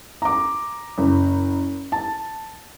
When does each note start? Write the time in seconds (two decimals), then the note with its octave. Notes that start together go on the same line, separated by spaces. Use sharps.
0.22 A#5 D6
0.98 F#1
1.92 A5